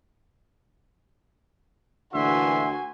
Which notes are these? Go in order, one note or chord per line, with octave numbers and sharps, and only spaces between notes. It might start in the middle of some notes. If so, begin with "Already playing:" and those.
D2 A#2 D3 E3 F#4 E5 G#5 C6